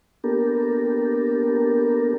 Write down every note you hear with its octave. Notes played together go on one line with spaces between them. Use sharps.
A#3 B3 D4 G4 A4 A#4